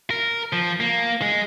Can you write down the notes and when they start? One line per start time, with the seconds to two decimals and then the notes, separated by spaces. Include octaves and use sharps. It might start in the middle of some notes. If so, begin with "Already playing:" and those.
0.10 A#4
0.53 F3
0.80 A#3
1.22 G#3